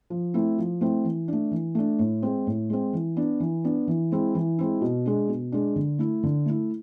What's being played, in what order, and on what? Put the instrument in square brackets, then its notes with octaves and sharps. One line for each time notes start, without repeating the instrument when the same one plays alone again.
[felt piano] F3
A3 C4 E4
F3
A3 C4 E4
E3
A3 D4
E3
A3 D4
A2
G#3 C4
A2
G#3 C4
E3
B3 D4
E3
B3 D4
E3
G#3 C4 E4
E3
G#3 C4 E4
B2
G#3 D4
B2
G#3 D4
D3
A3 E4
D3
A3 E4